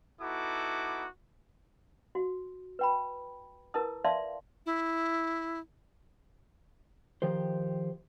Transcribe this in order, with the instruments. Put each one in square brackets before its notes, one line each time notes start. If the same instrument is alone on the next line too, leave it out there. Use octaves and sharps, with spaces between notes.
[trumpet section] B3 D#4 E4 F#4 A4 D6
[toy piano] F#4
B4 G5 B5
E4 A#4 B4 A5 D#6
D5 E5 F5 A5 C6
[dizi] E4
[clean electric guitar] D#3 F3 G4 C5